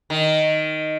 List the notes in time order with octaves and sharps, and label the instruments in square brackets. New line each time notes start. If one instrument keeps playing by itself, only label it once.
[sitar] D#3